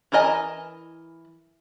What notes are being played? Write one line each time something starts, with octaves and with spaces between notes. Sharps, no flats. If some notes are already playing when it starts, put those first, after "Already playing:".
E3 E4 A#4 D#5 G#5